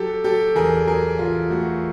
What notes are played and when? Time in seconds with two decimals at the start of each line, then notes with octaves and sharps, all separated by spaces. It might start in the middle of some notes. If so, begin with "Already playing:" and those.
Already playing: F#3 G4 A4
0.24 F#3 G4 A4
0.56 E2 G#4 A#4
0.87 F#3 G#4 A#4
1.19 E2 F4
1.50 A3 F#4